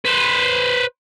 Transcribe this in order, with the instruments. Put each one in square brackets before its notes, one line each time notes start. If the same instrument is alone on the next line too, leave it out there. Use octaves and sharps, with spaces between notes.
[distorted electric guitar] B4 C5